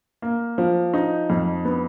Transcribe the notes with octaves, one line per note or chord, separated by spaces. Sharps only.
A#3
F3
D#4
F2
B3